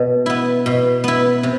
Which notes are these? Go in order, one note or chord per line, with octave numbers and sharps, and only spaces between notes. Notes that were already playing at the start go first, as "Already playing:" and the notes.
Already playing: B2
B3 E4
B2
B3 E4
C3